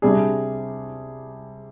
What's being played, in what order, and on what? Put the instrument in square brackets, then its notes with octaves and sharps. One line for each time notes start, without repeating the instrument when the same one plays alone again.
[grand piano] C3 G3 D4 G#4